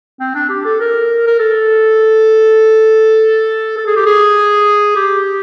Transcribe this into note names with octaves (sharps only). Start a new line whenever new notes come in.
C4
D4
G4
A4
A#4
A#4
A4
A4
G#4
G4
G#4
G4